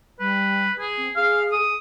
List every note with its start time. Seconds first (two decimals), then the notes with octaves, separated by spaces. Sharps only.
0.20 G3 B4
0.79 G#4
0.98 C4
1.16 G#4 F5
1.52 D#6